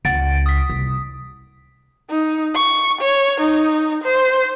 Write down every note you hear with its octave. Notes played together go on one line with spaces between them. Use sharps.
C#2 F#5 A6 D7
D#6 B6
C2
D#4
C#6
C#5
D#4
C5